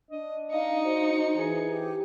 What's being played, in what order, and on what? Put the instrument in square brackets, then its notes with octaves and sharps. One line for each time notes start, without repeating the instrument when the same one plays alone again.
[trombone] D4 [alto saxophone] D#5
[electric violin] D#4 C#7 [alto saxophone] D#5 [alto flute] F5
[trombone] F#4 [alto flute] C5
[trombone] E3 [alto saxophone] G#4
[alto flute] G4